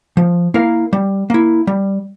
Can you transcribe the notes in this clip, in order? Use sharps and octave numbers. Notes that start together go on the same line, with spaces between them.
F3
A#3 E4 A#4 F5
G3
A#3 E4
G3